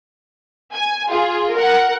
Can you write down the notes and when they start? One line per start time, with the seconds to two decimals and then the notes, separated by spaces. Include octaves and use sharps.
0.74 G#5
1.07 F4 G#4
1.53 A#4 F#5